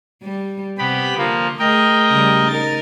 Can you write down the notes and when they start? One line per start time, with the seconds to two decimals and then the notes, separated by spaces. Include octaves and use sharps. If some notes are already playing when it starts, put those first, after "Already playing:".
0.23 G3
0.78 C3 B3 G4 B5
1.18 D3 F3 A#3
1.59 A3 G#4 A#4 D#5 G5
2.10 C#3 G3
2.48 D#4 A#4 A6